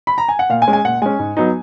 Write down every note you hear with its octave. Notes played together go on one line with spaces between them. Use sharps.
B5
A#5
G#5
F#5
A#2 F5
G#5
G#3 C#4
G#5
A#2 F#5
G#3 C#4 G#5
G#2
F#3 B3 D#4